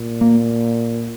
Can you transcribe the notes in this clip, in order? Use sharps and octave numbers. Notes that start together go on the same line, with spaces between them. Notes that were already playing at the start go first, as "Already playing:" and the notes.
Already playing: A#2
A#3